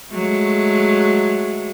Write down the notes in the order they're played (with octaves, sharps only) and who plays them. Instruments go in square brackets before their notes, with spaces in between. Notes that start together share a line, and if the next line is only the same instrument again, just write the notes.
[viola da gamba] F#3 G#3 A3